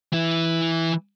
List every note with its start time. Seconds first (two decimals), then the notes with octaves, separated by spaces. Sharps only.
0.13 E3 E4